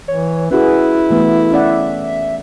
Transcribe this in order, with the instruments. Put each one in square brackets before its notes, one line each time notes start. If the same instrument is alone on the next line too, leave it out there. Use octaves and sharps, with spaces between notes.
[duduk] E3 [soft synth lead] C#5
[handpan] C#4 F#4 G#4 [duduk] E4 [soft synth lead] B4
[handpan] E3 A3 B3
[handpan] C#4 D5 F#5 [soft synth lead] E5